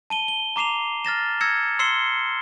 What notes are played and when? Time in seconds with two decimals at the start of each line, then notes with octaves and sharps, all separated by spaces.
0.10 A5 D#7 G7
0.28 G7
0.56 A#5 D6 C7 E7 F7
1.05 F6 A6 A#6 E7
1.41 E6 G#6 A#6 C#7 E7
1.79 C6 E6 C7 C#7 E7 G7